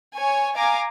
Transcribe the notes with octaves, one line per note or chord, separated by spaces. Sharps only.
C#5 G#5
F5 G#5 A#5 D6